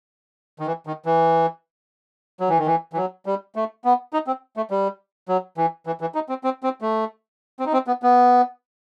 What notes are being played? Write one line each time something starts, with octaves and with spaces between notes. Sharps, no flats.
D#3
E3
D#3
E3
F#3
E3
D#3
E3
E3
F#3
G3
A3
B3
D#4
C4
A3
G3
F#3
E3
E3
E3
D#4
C4
C4
C4
A3
C4
D#4
C4
B3
B3